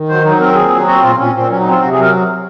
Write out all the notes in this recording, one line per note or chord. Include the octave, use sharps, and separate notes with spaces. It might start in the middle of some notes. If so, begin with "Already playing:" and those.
Already playing: D#3
F#3 C5
F#3 D#4
C4 A#4
A#2 G#4
F#3
C4 F#4
A#2 F4
A#2 C#4
A#2 C4
F#3 C#4
C4 D#4
F4
C3 F#4
F#3 G#4
A#4